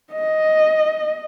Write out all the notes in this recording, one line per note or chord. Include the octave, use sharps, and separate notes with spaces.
D#5